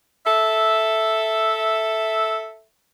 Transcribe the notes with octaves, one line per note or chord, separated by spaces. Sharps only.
A4 E5